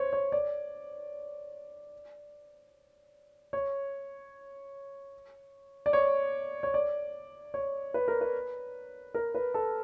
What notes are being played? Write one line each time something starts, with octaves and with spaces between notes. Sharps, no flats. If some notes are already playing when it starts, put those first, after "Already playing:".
Already playing: C5 C#5
C#5
D5
C#5
D5
C#5
C#5
D5
C#5
B4
A#4
B4
A#4
B4
A4